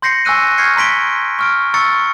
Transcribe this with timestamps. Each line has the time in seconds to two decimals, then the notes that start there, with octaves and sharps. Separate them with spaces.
0.02 C6 G6 A#6 C7 C#7
0.25 G#5 C#6 E6 F#6 D#7
0.58 C#6 F6 G6 G#6 C7 C#7
0.76 A#5 C6 B6 D7 G7
1.39 C#6 F6 D7
1.74 A#5 C#6 E6 A6 C#7